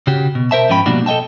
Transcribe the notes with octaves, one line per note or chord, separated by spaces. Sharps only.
C#3 F#4 G4
B2
A#4 C5 E5 A5
G#2 F3 C#4 G5 B5
B2 F3 G3 A#3 D4 F#4
A4 D#5 E5 G5 A5